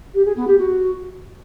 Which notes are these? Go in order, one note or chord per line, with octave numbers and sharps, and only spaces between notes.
G4
G#4
B3
G4
F#4